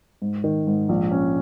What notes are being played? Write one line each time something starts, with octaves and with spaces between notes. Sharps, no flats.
G#2
D#3
G#2
A#1
C#4